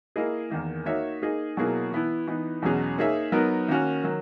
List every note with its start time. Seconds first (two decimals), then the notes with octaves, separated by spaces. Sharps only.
0.16 A#3 E4 G#4 D#5
0.50 E2 D#3 A#3
0.86 A#3 D#4 F#4 C#5 E5
1.22 A#3 D#4 G#4 D#5
1.57 B2 F#3 A#3 E4 G#4
1.91 E3 B3 E4
2.27 E3 B3 D#4
2.62 E2 B2 F#3 C#4 G#4
2.98 A#3 D#4 G#4 C#5 E5
3.32 F#3 B3 D#4 A#4
3.68 D#3 A#3 C#4 F#4
4.04 D#3 F#3